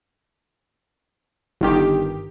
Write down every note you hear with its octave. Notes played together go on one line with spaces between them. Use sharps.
G1 D#3 G4